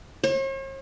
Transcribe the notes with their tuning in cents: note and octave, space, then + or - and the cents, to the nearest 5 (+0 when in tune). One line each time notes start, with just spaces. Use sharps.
C#5 -45